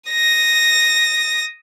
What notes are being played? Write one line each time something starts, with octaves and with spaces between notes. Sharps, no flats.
D#6 A#6